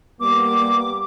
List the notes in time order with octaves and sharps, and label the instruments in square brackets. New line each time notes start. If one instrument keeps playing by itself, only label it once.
[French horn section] G3 A#3 B3 [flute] D6